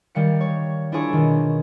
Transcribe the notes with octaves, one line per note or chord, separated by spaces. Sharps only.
D#3 G3 F5 C#7
C#5
D4 E4 F4 G#4 C#5
B2 D#3